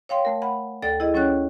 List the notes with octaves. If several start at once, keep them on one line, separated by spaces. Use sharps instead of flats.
C#5 F5 G5 C6
A3 A#4
F#5 B5
D2 A4 D5 G5 A6
E4 G#4 D#5
F#3 C#4 C#5 G5 F#6